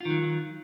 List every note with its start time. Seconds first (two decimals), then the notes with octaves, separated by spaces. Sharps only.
0.01 F4
0.05 D#3
0.10 F#3